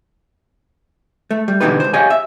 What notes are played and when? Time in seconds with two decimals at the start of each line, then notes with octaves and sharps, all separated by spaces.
1.31 A3
1.48 G3
1.60 B2 D3 E3 D#4 G4 B4
1.80 C#2 C5
1.93 G4 C#5 D#5 F5 G#5
2.10 E5